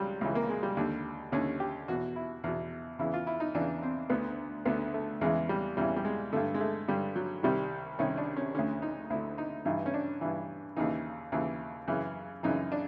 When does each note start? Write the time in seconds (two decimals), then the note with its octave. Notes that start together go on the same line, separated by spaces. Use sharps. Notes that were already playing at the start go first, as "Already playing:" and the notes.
Already playing: C#2 C#3 F#3 G3
0.21 C#2 C#3 E3
0.35 A#3
0.49 G#3
0.63 G3
0.77 D#2 D3
1.32 D#2 D3 C#4
1.60 G4
1.88 E2 B2 F#4
2.16 E4
2.44 E2 B2
2.99 E2 C#3 E3 E4
3.14 F4
3.27 E4
3.40 D#4
3.55 E2 C#3 E3 D4
3.82 C4
4.10 D2 D3 B3
4.65 D2 D3 B3
4.94 A3
5.21 E2 C#3 E3 G#3
5.49 G3
5.77 E2 C#3 E3 G3
5.96 G3
6.05 G#3
6.32 G2 D3 A3
6.54 G#3
6.60 A3
6.88 G2 D3 G3
7.16 F#3
7.43 C2 C3 D#3 G3
7.99 C2 C3 D#3 C#4
8.17 D4
8.37 C#4
8.54 D2 D3 C#4
8.82 D#4
9.10 D2 D3 E4
9.38 D#4
9.65 G2 E3 D#4
9.86 C#4
9.94 D4
10.21 G2 E3
10.76 D#2 C#3 E3 D#4
11.32 D#2 C#3 E3
11.88 F#2 C#3 E3
12.43 F#2 C#3 E3 D#4
12.72 D4